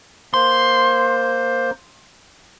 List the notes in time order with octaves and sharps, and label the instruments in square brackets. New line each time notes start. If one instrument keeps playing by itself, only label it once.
[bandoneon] A#3 C5 [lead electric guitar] C6